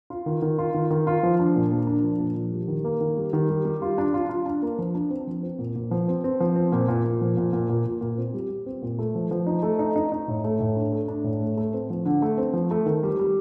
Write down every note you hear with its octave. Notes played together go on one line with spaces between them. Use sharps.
F4
D#3
D#3
F4
D#3
D#3
F4
F3
D4
A#2
A#3
D4
F3
A#2
F3
G3
D#3
A#3
D#3
G3
D#3
G3
G3
F4
D4
F4
F4
D4
A#3
F3
D4
C4
F3
C4
A#2
A#2
F3
C4
C4
F3
C4
A#2
A#2
A#2
F3
A#2
A#2
A#2
A#2
A#2
C4
G3
G3
C4
A#2
A3
F3
F3
D#4
A3
D#4
D#4
D#4
A2
A3
A2
D4
A3
D4
A2
A3
A3
C4
F3
D3
A3
C4
F3
A3
D#3
G3
G3